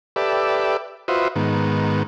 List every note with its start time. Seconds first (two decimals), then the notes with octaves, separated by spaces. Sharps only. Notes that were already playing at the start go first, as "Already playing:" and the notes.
0.16 G4 A4 B4 D5 E5
1.08 F4 F#4 B4 C5 D#5 E5
1.36 G#2 D#3 B3